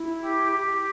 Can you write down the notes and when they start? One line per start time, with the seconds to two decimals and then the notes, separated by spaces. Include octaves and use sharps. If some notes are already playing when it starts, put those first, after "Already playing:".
Already playing: E4
0.22 G4
0.52 G4